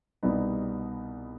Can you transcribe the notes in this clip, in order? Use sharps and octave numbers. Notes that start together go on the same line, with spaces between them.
C2 B2 G3 B3 D#4